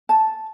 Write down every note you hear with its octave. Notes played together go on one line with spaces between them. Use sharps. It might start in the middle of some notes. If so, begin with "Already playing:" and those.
A5